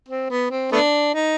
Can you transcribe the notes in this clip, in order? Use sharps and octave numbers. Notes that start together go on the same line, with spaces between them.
C4
B3
C4
A3 B3 D4
D#4